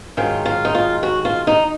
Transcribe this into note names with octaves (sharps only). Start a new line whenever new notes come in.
G#2 D#3 F#3 F4
F4
D#4
F4
F#4
F4
D#4